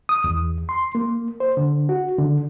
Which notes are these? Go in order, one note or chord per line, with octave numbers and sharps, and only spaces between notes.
D#6
E2
C6
A#3
C5
D3
F#4
D3